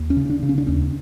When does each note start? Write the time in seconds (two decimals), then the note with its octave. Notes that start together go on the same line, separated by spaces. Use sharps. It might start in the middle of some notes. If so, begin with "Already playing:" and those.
Already playing: D#2
0.10 C#4
0.17 C#3
0.30 D4
0.43 C#3
0.49 C#4
0.58 D4
0.67 D#2 C#4